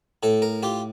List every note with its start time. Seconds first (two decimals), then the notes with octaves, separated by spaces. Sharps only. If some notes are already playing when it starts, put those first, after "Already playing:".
0.23 A2 A4
0.42 A#4
0.63 F4 G4